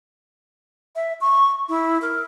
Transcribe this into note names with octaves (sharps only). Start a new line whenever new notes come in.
E5
C#6
E4
A#4